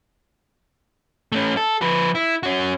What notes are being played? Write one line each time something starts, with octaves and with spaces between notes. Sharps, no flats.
A3 C#4
A4
F3 B4
E4
C#4 F#4